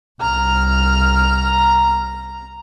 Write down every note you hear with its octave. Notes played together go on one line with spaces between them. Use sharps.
C2 A#5 F6